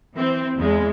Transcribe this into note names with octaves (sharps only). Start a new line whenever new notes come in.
E3 C4
E2 G#3